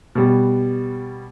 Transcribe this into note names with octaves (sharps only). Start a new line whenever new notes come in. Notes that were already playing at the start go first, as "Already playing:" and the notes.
B2 G3